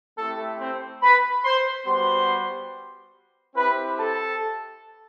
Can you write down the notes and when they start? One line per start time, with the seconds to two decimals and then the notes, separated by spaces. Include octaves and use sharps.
0.17 A3 C4 E4 G4 A4
0.59 C4 C5
1.01 B4 B5
1.44 C5 C6
1.86 G3 B3 F#4 C5 C6
3.55 C4 E4 G4 B4 B5
3.97 A4 A5